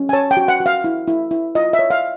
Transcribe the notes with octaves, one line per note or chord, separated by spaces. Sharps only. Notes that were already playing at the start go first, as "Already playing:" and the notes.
Already playing: C#4
G#5
C#5 A5
G5
F#4
F#5
F#4
F5
E4
E4
E4
F4 D#5
E5
C#5
F5